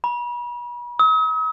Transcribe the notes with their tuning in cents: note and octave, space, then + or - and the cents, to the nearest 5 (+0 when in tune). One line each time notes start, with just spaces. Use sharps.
B5 -40
D#6 +45